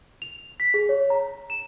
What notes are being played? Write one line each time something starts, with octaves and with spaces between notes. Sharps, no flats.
F7
B6
G#4
C#5
A#5
E7